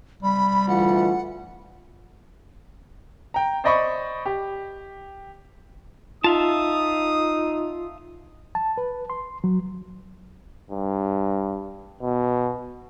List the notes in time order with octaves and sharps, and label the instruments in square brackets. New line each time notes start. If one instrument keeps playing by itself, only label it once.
[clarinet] G3 [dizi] B5
[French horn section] D2 E3 F4 [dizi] F#5
[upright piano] G5 A#5
C5 D5 D#5 B5 C#6
G4
[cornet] D#4 [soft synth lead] F4 [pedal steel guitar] E5 F5 A5 [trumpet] D#6
[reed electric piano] A5
B4
C6
F#3
[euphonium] G2
B2